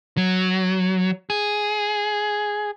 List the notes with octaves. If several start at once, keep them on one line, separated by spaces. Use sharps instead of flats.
F#3
G#4